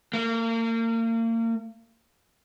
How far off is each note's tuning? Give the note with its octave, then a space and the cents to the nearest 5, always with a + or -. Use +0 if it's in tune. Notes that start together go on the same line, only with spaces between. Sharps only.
A#3 -35